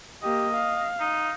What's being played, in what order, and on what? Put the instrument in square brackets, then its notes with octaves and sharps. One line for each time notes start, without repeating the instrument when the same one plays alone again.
[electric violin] A#3 G4 [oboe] D#5
[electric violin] F5
[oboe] D#4